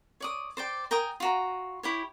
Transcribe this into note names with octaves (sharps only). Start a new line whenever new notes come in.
C#5 D5 D#6
C5 D5 G5
A#4 G5 G#5 D#6
F4 F#4 A#5
E4 G4 C#5